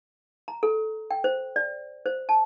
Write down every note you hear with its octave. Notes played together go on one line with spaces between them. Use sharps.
A#5
A4
G5
C5
D5
C5
A5